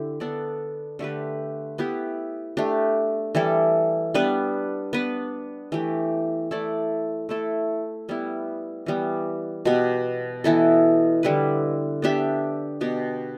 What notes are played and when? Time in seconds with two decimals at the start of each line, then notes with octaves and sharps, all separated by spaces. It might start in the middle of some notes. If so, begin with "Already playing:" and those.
Already playing: D3 E4 G4
0.20 B3 D4 A4 D5
0.99 D3 A3 G4 B4
1.78 B3 E4 G4 B4
2.57 A3 D4 G4
3.35 E3 G3 E4 A4
4.14 G3 B3 D4 B4
4.93 B3 D4 B4
5.72 E3 A3 G4
6.51 A3 E4 A4 D5
7.29 A3 E4 A4
8.09 G3 B3 E4
8.86 E3 G3 B3
9.65 B2 B3 G4
10.44 E3 B3 E4 A4
11.23 D3 G3 E4 B4
12.02 B3 D4 G4 E5
12.81 B2 B3 G4